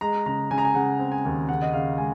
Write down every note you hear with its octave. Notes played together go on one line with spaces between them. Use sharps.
G#3 A#5
C#3 A#5
C#3 G#5
A#5
G#5
C#3 F#5
C4
G#5
D#2
C#3 F#5
D#5
C#3 F5
G#3 G#5